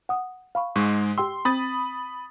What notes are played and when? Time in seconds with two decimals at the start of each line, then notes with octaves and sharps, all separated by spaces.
0.09 F#5 D#6
0.55 F5 B5 C#6
0.76 G#2 G#3 C#6
1.18 G4 G5 C6 E6
1.45 C4 B5 D#6 G6 A6